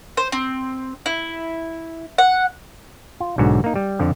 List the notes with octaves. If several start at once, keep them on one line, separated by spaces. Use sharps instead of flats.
C5
C4
E4
F#5
F4
B1 G#2 D3 F#4
A#3 D#4
G3
F2 D3 F3